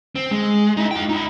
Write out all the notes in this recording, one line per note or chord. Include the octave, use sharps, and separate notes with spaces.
C4
G#3
D#4 E4
F4 G5
D#4 E4